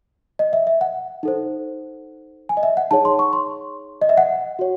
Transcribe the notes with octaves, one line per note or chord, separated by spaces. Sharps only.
D#5
E5
E5
F#5
D#4 A4 C5
G#5
D#5
E5
F#5
D#4 G#4 C#5 A5
C6
C#6
C6
D#5
E5
F#5
F#4 C#5